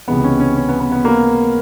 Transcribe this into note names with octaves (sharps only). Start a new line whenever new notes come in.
C#2 C3 E3 G#3 B3
C#4
C#4
C#4
B3
B3
B3
A#3